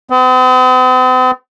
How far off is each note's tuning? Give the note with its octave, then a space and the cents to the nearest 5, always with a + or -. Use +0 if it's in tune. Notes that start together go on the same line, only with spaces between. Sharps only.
C4 -45